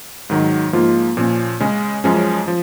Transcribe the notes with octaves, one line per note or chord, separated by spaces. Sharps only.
G#2 D#3 F#3
G#2 F3 A#3 F4
A#2 F3 A#3 C#4
C#3 G#3 C#4
F#2 F3 G#3 C#4
F3